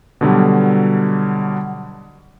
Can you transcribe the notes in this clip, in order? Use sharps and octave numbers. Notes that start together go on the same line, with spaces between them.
B2 D3 F#3 G3